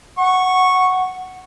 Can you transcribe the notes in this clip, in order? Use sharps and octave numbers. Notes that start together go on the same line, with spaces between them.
F#5 C#6